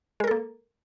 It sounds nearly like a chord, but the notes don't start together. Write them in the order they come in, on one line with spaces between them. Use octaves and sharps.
G#3 A#4 A4 A#3